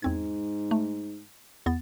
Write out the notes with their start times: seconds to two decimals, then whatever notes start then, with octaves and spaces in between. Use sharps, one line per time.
0.02 E2 G#2 C4 G#6
0.71 A3
1.66 E2 B3 A6